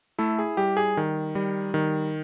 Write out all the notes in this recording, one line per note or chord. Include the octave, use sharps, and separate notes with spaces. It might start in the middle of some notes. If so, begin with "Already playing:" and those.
A3 E4 A4
G#4
G3 G4
G#4
D#3
G3
D#3